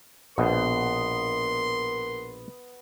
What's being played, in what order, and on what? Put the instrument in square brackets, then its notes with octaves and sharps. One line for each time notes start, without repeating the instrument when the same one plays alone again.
[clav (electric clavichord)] A#1 B2 [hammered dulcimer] B3 [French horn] A#4 [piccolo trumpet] C6